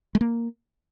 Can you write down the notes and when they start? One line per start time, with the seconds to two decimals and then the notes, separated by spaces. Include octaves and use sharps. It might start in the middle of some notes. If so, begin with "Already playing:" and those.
0.15 G#3
0.21 A#3